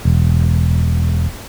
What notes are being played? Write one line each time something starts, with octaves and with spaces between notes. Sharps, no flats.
E1